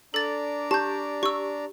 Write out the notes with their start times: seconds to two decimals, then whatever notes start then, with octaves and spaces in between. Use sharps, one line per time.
0.14 D4 A4 D5 A#5 A6
0.71 G4 A5 C#6 G6
1.23 G4 C#6 E6